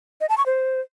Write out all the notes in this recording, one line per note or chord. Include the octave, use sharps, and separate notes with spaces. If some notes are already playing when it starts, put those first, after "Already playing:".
D#5
A5
C#6
C5